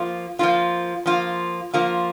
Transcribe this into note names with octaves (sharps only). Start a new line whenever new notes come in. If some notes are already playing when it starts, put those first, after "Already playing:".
Already playing: F3 A#3 F4
F3 A#3 F4
F3 A#3 F4
F3 A#3 F4